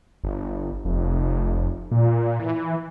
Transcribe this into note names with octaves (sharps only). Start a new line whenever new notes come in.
G1
F1
A#2
E3